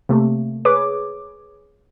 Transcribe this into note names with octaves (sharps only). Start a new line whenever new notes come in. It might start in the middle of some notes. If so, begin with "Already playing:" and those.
C3 A3 A#3
G#4 B4 C#5 D6